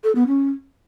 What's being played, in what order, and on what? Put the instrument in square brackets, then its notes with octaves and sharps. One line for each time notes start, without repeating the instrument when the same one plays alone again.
[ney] A4
B3
C#4